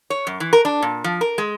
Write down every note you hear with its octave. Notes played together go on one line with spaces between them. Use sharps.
C#5
F#2
E3
A#4
D4
A#2
F3
A#4
G#3